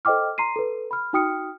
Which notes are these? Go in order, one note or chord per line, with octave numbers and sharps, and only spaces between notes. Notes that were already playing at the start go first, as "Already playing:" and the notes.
A4 C5 D#5 G5 D6 F6
A#5 C6 C7 D#7
A4 B4
B5 F6
D#4 F#4 G5 D#6 F6 C#7